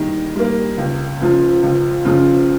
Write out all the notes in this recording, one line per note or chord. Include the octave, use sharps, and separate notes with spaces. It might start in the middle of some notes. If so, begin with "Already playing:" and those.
Already playing: D#3 G3 A#3
G3 A#3
C#2
C#3 F3
C#2
C#3 F3